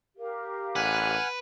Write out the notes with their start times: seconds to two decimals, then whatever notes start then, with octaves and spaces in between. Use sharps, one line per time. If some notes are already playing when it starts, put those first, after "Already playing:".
0.18 G4 A#4 F5
0.76 A1 B4 F#5 G#5 F6